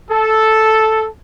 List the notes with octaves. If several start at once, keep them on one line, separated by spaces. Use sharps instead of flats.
A4